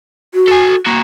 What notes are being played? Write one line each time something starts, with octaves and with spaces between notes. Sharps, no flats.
F#4
A4 G#5
A#3 F#4